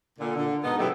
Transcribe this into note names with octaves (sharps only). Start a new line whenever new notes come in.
A#2 D3
D3
G#2 B2 B3 D#4
C3 F#3 A3 B3 E4 G4